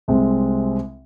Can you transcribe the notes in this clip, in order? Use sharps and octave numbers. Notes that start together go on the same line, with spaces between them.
C2 C3 G#3 C4